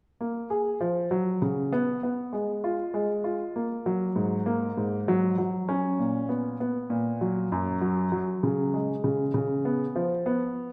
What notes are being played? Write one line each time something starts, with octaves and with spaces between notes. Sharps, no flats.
A#3
G#4
F3
F#3
C#3
B3
B3
G#3
F4
G#3
F4
A#3
F#3
G#2
A#3
G#2
F#3
F#3
C#4
A#2
B3
B3
A#2
F#3
F#2
F#3
F#3
C#3
G#3
C#3
C#3
B3
F3
B3